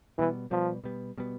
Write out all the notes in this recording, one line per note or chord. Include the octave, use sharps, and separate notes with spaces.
B2 E3 G3 B3
B2 F3 G3 B3
B2 G3 B3
B2 G3 B3